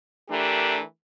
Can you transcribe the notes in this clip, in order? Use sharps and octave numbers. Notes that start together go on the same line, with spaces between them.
E3 A3 D4 G4 A#4